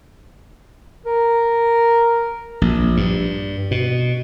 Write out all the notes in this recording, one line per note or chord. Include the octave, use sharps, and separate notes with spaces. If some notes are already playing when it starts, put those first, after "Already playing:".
A#4
A#1
G2
B2